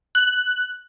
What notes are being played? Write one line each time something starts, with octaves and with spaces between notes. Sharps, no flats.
F#6